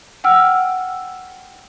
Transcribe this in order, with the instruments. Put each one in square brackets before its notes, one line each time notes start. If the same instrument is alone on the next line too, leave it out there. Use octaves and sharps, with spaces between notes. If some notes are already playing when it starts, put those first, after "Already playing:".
[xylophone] F#5 G5 E6 F6